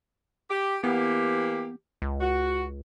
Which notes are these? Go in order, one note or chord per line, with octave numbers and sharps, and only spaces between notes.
G4
E3 A#3 B3 G4
C#2
F#4